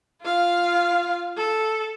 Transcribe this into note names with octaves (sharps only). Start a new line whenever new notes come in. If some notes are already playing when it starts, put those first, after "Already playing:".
F4 F5
A4